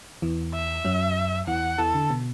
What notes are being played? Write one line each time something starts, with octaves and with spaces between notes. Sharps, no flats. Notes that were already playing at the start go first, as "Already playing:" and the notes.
E2 E3
E5
F#2 F#3
E2 E3 F#5
E2 E3 A4
D3
B2